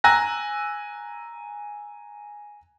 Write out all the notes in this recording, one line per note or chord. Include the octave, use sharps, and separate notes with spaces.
G#5 A#5 E6 F#6 A#6